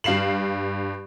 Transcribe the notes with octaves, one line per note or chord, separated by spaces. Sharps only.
G2 F5 C7 E7 F#7